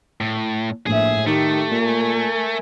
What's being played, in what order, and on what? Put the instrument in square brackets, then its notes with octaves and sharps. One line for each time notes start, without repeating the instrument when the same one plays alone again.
[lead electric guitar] A2
[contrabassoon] A#1 [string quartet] A2 E5 [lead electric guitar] G#4
[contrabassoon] D#3 [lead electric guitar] A3 [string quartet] G4
[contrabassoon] A#2 [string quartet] A#4 G#5